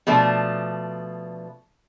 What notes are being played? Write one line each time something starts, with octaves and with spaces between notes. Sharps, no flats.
B2 F3 A3 D4